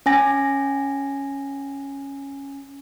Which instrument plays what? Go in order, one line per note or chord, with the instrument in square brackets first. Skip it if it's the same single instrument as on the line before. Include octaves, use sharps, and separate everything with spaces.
[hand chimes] C#4 G#5 A#6